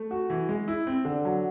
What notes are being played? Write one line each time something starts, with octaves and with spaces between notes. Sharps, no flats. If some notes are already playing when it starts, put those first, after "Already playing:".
Already playing: A3
F#4
E3
G#3
E4
C4
D3
F#3